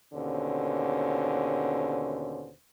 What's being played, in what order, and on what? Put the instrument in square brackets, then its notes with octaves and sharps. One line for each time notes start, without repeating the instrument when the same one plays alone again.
[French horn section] D#2 B2 D3 C#4 C5